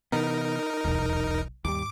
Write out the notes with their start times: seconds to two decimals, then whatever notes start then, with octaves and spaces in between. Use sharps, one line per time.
0.12 C3 E3 B3 D#4 A#4
0.85 D#1 B1 E2
1.65 D#2 G#2 G3 D6